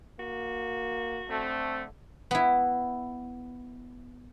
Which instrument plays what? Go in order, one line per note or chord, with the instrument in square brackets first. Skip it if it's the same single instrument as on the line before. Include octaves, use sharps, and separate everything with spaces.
[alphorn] A#3 [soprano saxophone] F#4
[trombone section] D3 A3 [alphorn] C4
[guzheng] B3 E4